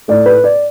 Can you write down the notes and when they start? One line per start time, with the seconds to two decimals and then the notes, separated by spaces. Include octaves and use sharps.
0.08 A2 A3 D5
0.26 B4
0.44 D5